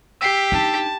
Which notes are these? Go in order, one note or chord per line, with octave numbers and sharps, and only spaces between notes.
G4 E6 B6 C7
D4 D#4 A5